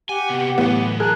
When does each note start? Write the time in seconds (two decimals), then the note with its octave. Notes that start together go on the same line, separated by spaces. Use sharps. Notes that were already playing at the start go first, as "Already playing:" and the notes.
0.09 G4 F#5 G#5
0.30 C3 B3
0.58 A2 E3 F#3 B3
1.00 G#4 A#4 A5 F#6